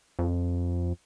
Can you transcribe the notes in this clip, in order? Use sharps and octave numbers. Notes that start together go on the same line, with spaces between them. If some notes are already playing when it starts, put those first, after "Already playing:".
F2